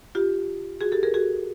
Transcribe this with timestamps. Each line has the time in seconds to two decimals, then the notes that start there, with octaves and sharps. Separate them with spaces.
0.15 F4 G4
0.81 F#4 G#4
0.92 G4 A4
1.03 G#4 A#4
1.14 F#4 G#4